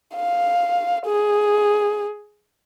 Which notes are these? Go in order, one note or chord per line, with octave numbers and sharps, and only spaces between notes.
F5
G#4